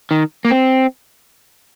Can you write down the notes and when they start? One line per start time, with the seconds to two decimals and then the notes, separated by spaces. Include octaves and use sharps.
0.11 D#3
0.45 A#3
0.50 C4